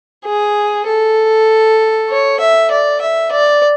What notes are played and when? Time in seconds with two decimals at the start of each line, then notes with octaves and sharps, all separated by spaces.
0.25 G#4
0.87 A4
2.10 C#5
2.40 E5
2.71 D5
3.01 E5
3.31 D5